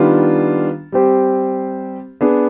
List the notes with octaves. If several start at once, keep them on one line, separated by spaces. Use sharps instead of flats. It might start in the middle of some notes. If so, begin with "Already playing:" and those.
Already playing: D#3 G3 B3 D4 F4
G3 C4 G4 C5
B3 D4 G#4